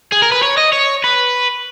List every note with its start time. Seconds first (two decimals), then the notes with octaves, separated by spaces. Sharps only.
0.12 G#4
0.22 A#4
0.32 B4
0.43 C#5
0.57 D#5
0.73 C#5
1.04 B4